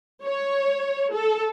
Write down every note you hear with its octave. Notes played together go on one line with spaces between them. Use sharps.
C#5
A4